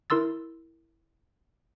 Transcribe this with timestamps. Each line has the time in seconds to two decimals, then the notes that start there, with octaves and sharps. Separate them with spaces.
0.10 E4 A#4 C6 E6 A6